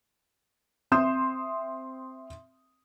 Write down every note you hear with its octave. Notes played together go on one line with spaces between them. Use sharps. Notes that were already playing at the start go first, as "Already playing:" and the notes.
C4 E5 C6 D#6 G6 E7